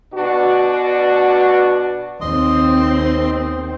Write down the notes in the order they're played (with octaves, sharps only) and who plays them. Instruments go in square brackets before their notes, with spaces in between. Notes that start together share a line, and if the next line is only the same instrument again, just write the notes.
[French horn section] B2 D4 F#4
[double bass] D#2 [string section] C4 [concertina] D#5 C6